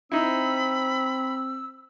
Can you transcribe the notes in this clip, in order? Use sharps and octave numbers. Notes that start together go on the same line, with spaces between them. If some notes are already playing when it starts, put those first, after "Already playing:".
C4 D#4 E4 B5 E6